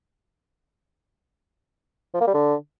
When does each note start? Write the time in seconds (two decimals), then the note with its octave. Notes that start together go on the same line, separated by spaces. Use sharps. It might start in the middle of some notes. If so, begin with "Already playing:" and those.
2.14 F3
2.21 A#3
2.27 G3
2.34 D3